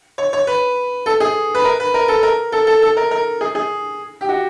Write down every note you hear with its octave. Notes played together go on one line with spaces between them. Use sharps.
C#5
C#5
B4
A4
G#4
B4
A#4
B4
A#4
A4
A#4
A4
A4
A4
A#4
A#4
G#4
G#4
G4
F#4